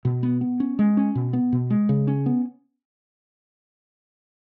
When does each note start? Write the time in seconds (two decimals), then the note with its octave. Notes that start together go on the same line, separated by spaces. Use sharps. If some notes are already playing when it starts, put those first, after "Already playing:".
0.05 B2
0.23 B3
0.41 B3
0.60 C#4
0.79 G#3
0.97 C#4
1.15 B2
1.33 B3
1.53 B2
1.70 G#3
1.89 C#3
2.07 C#4
2.26 B3